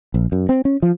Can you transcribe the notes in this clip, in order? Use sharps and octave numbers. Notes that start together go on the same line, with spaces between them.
A#1
F#2
C4
C#4
F3